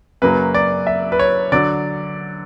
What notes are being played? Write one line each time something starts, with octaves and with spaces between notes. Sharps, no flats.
F#2 C#3 F#3 A#3 B4
D5
E5
B4
C#5
D3 F#3 D5